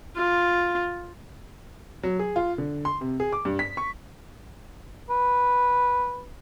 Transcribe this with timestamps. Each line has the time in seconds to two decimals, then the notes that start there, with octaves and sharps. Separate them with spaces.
0.16 F4
2.03 F#3
2.19 G#4
2.36 F4
2.58 D3
2.85 C6
3.01 C3
3.20 G#4
3.33 D6
3.45 G2
3.59 B6
3.77 C#6
5.10 B4